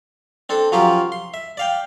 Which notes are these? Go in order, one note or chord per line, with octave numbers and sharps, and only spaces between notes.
C4 D4 A4
F3 F#3 C#4 F4 G4 A#4
C6
E5
D5 F5 G5